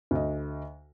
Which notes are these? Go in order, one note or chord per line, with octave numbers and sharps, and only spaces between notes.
D2 D#5